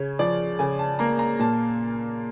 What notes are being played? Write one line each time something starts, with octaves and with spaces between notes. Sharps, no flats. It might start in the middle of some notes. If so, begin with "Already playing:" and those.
Already playing: C#3 C#5
F3 D5
C#3 G#5
A5
A#3 A#5
A#5
A#2 A5